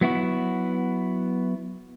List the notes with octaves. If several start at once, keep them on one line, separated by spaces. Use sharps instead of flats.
F#3 B3 E4 F#4